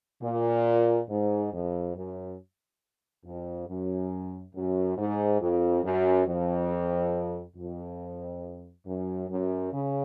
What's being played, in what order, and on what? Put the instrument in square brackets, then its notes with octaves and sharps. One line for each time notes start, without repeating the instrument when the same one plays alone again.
[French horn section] A#2
G#2
F2
F#2
F2
F#2
F#2
G#2
F2
F#2
F2
F2
F#2
F#2
C#3